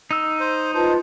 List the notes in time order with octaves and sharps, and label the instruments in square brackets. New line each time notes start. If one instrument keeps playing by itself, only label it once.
[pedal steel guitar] D#4 E6
[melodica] C5
[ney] F4 [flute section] B4 D#5 A5 [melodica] C5